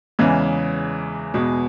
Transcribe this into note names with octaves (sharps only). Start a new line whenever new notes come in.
E2 C#3 E3 G#3 C#4
E2 B2 G#3